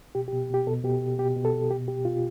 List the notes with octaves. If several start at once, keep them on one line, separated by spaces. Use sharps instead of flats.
B2 G4
G4
B2
B2 G4
B2 A4
B2 G4
B2
B2 G4
B2
A4
B2
B2 G4
B2 G4
B2 F4